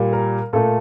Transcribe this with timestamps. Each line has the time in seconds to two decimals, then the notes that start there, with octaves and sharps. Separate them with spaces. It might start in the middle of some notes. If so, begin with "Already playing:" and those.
Already playing: A#2 G3
0.13 A#4
0.53 A#2 A3 A4